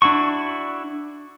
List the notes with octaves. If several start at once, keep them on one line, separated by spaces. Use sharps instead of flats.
D4 E4 F#4 C#6